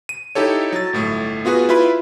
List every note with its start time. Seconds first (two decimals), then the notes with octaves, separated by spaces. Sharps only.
0.09 D#7
0.35 D#4 E4 G4 A4 C#5
0.72 F#3 A6
0.93 G1 A2 A3
1.45 B3 F4 F#4 G#4 B4
1.69 E4 F4 B4 B5